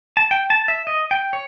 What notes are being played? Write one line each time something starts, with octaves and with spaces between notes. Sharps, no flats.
A5
G5
A5
E5
D#5
G5
C#5